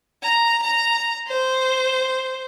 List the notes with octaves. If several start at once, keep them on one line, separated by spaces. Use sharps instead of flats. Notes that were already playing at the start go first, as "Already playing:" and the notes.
A#5
A#5
C5